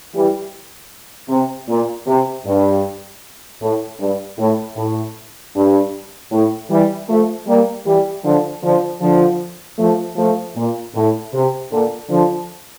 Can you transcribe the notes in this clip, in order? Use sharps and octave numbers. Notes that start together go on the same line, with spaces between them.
E3 G3
C3
A#2
C3
G2
A2
G2
A2
A2
G2
A2
E3 G3
F3 A3
G3 A#3
E3 G3
D3 F3
D3 F3
D3 F3
F3 A3
F3 A3
A#2
A2
C3
A#2 D3
D3 F3